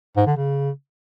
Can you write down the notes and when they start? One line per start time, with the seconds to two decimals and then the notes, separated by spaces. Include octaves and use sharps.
0.17 G#2
0.27 D3
0.37 C#3